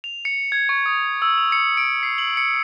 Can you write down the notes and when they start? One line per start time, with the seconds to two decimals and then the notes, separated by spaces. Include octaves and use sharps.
0.04 F7
0.25 C#7
0.52 G#6
0.69 C#6
0.86 D#6
1.22 E6
1.38 F7
1.52 C#7
1.77 D7
2.03 C7
2.18 F#7
2.37 C#7